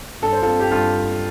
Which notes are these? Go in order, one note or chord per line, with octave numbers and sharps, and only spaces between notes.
G2 A4
C5
C4 F4 A4
G4
G2 F4 A4
G2